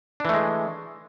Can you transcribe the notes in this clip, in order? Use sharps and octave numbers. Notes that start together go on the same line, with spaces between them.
E3 G#3 A3 D4